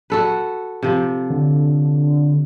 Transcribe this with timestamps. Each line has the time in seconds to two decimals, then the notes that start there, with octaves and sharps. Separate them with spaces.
0.10 F#4 A4 B4
0.83 C3 F3
1.30 D3